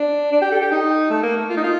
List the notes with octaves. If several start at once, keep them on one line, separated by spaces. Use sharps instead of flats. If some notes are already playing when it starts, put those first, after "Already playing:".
Already playing: D4
D4
G4
A4
G4
D#4
A3
A#3
A3
F4
D#4
F4